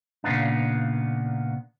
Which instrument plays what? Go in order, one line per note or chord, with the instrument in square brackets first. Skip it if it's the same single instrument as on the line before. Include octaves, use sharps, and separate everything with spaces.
[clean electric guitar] A#2 C#3 A#3 B3 D4